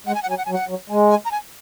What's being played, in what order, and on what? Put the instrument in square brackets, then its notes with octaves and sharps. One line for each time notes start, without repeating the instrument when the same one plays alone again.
[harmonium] G#3 [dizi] F#5
[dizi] G#5
F#5
[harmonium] F#3 [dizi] G#5
[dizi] F#5
G#5
[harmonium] F#3
[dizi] F#5
[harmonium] F#3
[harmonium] G#3 [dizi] G#5
[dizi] G#5
A#5
G#5